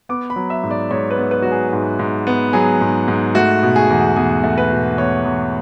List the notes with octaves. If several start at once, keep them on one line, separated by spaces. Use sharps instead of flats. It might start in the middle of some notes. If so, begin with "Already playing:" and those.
B3 D6
B5
F#3
E5
G#2
D5
G#2 C#5
B4
B3
B4
F#3 F#4
G#4
G#2
G#2
B3
F#3 G#4
G#2
G#2
A3 F#4
B2
G#4
E2
E2 G#4
A3
B4
B2
E2 C#5
E2